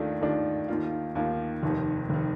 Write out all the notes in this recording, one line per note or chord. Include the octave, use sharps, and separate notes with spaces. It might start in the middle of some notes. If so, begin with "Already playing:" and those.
Already playing: D#2 D#3 A3 D4 F4
D#2 D#3 A3 D4 F4
D#2 D#3 A#3 F4
D#2 D#3 A#3 F4
F1 D#2 D#3
F1 D#3